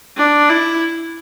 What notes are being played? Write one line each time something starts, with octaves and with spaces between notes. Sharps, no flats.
D4
E4